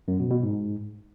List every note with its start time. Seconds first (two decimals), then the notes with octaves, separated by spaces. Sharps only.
0.08 F#2
0.20 B2
0.31 B2
0.43 G#2